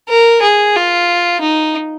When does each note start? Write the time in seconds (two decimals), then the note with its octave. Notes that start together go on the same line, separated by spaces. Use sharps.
0.09 A#4
0.42 G#4
0.76 F4
1.41 D#4